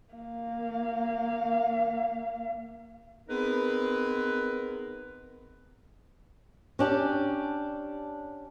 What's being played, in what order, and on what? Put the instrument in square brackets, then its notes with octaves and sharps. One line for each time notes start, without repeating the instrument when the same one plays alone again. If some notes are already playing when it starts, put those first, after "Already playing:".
[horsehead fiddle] A#3 F5
[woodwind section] B3 C4 D#4 G#4 A#4 B4
[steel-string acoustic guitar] C#4 D4 G4